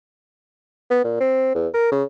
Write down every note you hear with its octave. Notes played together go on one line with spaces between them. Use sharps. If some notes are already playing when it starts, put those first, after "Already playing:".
B3
A#2
C4
E2
A#4
C#3